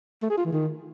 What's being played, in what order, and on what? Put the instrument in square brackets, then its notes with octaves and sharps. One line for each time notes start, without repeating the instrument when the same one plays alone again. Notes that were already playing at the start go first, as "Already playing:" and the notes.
[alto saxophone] A3
G#4
F4
E3
D#3